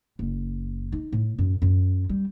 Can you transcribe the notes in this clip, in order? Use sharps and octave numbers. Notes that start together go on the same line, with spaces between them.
F#1
D#4
A2
F#2
F#2
G3